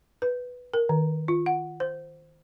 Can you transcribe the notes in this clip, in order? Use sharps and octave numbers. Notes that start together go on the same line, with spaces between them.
B4
A#4
D#3
F4
F#5
C5